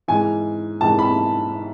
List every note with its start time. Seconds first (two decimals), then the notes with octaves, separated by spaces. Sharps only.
0.08 G#2 E3 G#5
0.81 G#2 E3 A5
0.99 B5